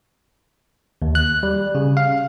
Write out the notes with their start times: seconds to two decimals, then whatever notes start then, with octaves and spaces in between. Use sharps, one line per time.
1.02 D#2
1.15 F#6
1.43 G3
1.75 C#3
1.97 F5